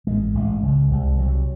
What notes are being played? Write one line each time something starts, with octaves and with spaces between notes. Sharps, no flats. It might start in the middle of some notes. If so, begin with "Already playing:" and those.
A1 G#2 G#3
A1 G#2
C#2 C#3
C2 C3
C2 C3 F#3